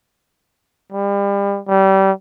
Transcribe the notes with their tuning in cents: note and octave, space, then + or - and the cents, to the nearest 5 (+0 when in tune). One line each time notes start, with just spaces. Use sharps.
G3 +35
G3 -25